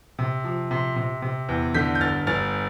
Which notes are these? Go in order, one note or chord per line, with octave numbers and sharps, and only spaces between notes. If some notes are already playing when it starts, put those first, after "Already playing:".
C3
F3
C3
C3
C3
E2
D3 G6 B6
G6
G1 F6 A6
G1 F6 A6